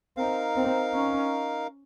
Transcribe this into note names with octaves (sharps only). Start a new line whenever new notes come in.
C4 D#4 A#4 F5
C4
C#4